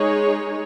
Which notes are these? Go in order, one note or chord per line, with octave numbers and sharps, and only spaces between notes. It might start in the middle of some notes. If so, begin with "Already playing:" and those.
Already playing: G#3 D#4 G#4 C#5